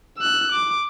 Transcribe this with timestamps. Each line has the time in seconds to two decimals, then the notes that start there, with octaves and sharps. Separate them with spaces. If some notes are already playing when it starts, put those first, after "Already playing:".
0.18 E6 F#6
0.52 D6